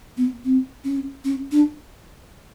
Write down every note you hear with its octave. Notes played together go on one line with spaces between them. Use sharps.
B3
C4
C#4
C#4
D4